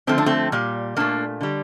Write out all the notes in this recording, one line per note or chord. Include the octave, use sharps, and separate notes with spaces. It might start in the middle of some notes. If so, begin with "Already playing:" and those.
D3 F3 A3 C4
D4
A3 C4
A#2 G3
A#2 A3 A#3 D4
D3 G3